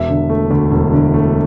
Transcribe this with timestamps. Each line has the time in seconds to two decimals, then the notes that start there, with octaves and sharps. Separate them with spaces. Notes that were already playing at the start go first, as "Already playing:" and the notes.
Already playing: E1 E5
0.09 D3
0.29 A3
0.51 D2
0.71 E1
0.93 D3
1.14 A3